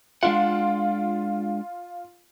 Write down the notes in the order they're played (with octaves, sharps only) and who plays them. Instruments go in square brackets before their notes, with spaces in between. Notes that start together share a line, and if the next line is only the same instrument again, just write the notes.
[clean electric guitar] G#3 D4 F#5 [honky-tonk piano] F4